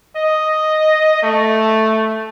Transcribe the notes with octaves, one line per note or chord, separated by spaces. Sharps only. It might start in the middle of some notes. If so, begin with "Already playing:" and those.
D#5
A3